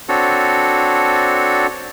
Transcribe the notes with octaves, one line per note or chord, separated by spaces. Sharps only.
C4 D4 F#4 A4 C#5